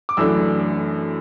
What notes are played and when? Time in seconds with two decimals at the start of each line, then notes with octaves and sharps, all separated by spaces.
0.09 D6
0.17 F#2 E3 A3 D4 E6